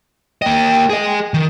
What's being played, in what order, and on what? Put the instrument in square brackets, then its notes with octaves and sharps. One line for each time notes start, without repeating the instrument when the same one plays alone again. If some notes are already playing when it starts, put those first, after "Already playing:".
[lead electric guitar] A#3 D#5 [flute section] G5
[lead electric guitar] G#4 D#5
D#3